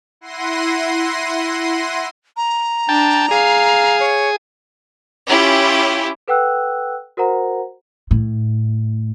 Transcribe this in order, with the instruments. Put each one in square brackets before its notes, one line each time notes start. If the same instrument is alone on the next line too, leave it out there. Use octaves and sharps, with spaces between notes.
[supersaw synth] E4 F#5 C6 A#6 C7 D#7
[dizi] A#5
[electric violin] D4 [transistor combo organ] G5 A5
[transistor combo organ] G#4 [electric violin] F5 C7
[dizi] C#5
[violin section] C#4 E4 F4 G4
[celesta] A4 B4 F#5 G5 E6 F#6
F#4 A#4 C5 F#5 A#5
[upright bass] A2